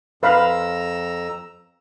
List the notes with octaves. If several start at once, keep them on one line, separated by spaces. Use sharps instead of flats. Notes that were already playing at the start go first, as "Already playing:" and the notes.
F2 B4 F5 A#5 B5 E6